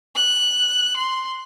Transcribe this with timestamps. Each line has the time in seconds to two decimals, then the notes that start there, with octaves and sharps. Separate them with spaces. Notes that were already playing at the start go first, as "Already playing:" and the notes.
0.15 F#6
0.96 C6